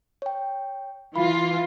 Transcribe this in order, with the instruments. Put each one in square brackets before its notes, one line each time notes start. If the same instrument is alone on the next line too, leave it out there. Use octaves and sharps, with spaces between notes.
[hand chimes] C#5 G5
[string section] E3 F4 [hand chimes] B5